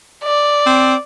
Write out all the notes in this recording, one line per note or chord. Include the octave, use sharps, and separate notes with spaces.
D5
C4